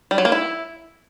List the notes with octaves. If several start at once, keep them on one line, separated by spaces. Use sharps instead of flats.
G3
F#3
A#3
E4